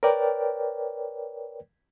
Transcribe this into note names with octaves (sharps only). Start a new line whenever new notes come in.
A#4 B4 C#5 D5 G5